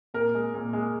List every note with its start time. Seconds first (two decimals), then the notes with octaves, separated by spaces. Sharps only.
0.14 A#2 A#4
0.34 G#3
0.54 A#2
0.73 G#3